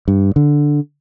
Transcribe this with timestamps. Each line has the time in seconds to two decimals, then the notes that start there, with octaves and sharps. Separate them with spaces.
0.08 G2
0.36 D3